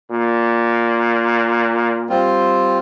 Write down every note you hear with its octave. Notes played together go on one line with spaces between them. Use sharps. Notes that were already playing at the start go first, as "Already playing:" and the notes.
A#2
G3 C4 F4